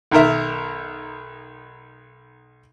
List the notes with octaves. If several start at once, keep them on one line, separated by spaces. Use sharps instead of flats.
B1 D#3 A#4 E5